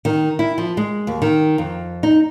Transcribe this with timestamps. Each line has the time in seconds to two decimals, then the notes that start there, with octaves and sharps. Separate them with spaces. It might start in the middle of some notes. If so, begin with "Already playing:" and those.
0.05 D#3
0.39 E4
0.58 F3
0.77 G#3
1.07 D#2
1.22 D#3
1.58 F2
2.03 D#4